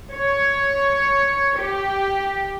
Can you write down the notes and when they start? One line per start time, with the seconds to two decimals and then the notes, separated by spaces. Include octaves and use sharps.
0.12 C#5
1.59 G4